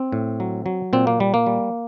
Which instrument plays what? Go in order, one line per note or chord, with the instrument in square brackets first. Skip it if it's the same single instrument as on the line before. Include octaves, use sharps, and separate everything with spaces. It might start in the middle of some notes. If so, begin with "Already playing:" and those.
Already playing: [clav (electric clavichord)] C4
A2
F#3
F#3
A#2 C4
A#3
G3
A#3
G3